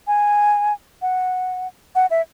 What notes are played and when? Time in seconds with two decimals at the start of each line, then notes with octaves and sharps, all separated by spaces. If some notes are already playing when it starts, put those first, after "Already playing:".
0.07 G#5
1.02 F#5
1.95 F#5
2.11 E5